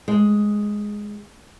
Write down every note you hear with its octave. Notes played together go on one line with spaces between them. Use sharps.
G#3